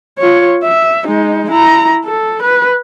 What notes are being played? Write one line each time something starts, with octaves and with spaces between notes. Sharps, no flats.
F4 C#5
E5
G#3 D#4
E4 A#5
A4
B4